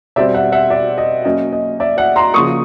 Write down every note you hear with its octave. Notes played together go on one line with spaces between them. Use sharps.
B2 G3 C4 D5 E5
E5 F#5
E5 F#5
D5 E5
D#5
F#3 A#3 C#4 D#5
D#5
D5 E5
E5 F#5
A#5 C6
C#3 F3 A#3 C#6 D#6